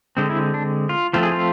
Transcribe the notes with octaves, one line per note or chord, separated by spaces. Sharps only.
D3 G#3 C4
E4
D4
F4
F3 A3 C4 F4
G#4
F4